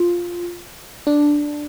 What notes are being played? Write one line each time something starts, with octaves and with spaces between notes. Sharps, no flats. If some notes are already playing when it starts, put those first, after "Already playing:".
Already playing: F4
D4